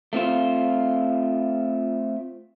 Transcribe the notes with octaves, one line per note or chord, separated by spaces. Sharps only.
A3 C4 F4 C5